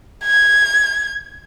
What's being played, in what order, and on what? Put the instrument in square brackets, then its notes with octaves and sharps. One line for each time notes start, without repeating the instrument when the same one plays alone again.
[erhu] G#6